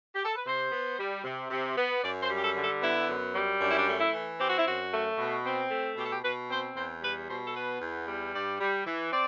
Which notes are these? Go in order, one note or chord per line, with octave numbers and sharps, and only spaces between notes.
G4
A4
B4
C3 C5
B3
G3
C3
C3
B3
F#2 D5
C5
G3
G4
A4
D3
A4
B3 E4
F#2
G3
F#2 D4
E4
D4
A3
E4
E3
C4 G4
F#4
E4
F#2 F#4
A3
B2
C4
A3
B2 G4
A4
G4
B2 B4
C4 C5
E2 C5
G3 B4
B2 C5
A4
B3 B4
E2
G3
G2 D5
G3
E3
C4 D5